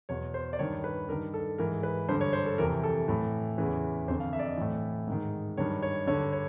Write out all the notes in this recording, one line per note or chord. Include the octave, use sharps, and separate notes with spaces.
E2 B2 C#5
C5
D5
G2 D#3 C#5
B4
G2 D#3 A#4
A4
G#2 E3 A#4
B4
G2 D3 C5
C#5
C5
A4
F2 C3 E3 A#4
A4
A2 E3
E2 C#3 E3 B4
F2 D3 C5
F5
E5
D5
D#5
A2 E3
G#2 D#3
G2 D#3 C#5
C#5
G2 D3 C#5
C#5